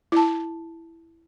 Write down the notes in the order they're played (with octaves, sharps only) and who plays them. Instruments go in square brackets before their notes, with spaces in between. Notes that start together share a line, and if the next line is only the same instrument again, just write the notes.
[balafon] E4 A5